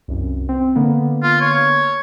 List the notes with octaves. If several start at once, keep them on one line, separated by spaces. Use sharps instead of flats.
C2 F#2
C4
D3 A#3 B3
F4
C#5